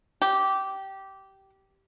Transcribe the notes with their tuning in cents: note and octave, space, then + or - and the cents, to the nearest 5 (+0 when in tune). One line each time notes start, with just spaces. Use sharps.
G4 -15